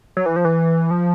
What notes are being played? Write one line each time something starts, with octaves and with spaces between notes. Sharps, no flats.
F#3
E3
F3
E3
F3